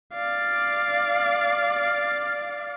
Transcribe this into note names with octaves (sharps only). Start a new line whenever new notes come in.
D5 F5